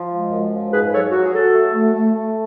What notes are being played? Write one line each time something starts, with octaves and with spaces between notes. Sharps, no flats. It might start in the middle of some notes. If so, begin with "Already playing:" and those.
Already playing: F3
G#3
F#2
F3
G#2 G#4 B4
F#3 A4 C#5
F#3 F#4
G#4
F#3 F#4 A4
A3
A3
A3
A3